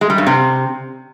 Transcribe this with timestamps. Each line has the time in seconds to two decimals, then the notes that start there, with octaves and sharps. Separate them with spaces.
0.01 G#3
0.10 G3
0.18 G2
0.27 C3